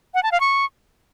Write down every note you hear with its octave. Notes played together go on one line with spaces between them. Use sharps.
F#5
A5
F5
C#6